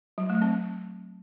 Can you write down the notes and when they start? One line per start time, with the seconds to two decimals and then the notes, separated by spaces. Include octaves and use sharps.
0.18 F#3
0.30 A3
0.42 C4